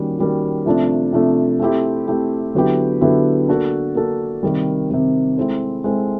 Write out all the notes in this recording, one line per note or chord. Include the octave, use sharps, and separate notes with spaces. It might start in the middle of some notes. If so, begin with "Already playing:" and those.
Already playing: D#3 G3 A#3 C#4 F#4
D#3 G3 A#3 C#4 F#4
C3 F3 A3 D4
C3 F3 A3 D4
A3 C4 E4 G4
A3 C4 E4 G4
D3 F#3 B3 E4 G4
D3 F#3 B3 E4 G4
A#3 D4 F#4 A4
A#3 D4 F#4 A4
C3 D#3 G3
C3 D#3 G3
G#3 C4 E4 A4 C5
G#3 C4 E4 A4 C5